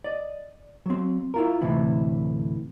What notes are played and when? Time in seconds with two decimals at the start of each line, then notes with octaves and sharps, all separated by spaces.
0.04 D5 D#5
0.86 F#3 C4
1.34 E4 F4 A#4
1.61 D2 A2 C3 E3 E4